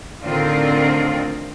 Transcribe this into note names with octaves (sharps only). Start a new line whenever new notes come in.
A2 D3 D#3 C4 F4 A#4